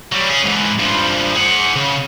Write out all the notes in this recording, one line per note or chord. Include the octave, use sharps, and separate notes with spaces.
F#3 G3
C#4 G#4
G#2 E3
G2 F3
G#4 F#5
C#3